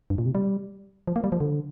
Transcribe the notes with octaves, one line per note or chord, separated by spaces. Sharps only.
G2
A#2
C3
G3
F3
A#3
G3
F3
D3